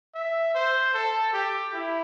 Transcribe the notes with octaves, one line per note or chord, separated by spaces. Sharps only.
E5
C5
A4
G4
E4